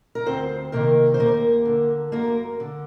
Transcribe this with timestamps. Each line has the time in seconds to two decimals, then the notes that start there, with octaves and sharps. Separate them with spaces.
0.15 A#4
0.25 D2 C4 C5
0.72 C3 D#3 A#3 A#4
1.14 C5
1.19 D#2 A#3 A#4
1.65 D3
2.12 F#2 A#3 A#4
2.60 D3